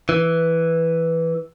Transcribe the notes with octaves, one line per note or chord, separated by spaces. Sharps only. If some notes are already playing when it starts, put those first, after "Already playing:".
E3